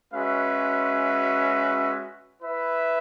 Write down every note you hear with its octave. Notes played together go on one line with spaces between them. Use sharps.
G#3 C#4 F#4 B4 E5
E4 B4 E5